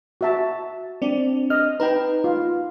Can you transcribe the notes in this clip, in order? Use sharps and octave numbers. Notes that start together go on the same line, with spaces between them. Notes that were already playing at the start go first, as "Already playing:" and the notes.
F#4 E5 A5
C4 D4 D5
D#5 F6
D#4 B4 G5 A#5
F4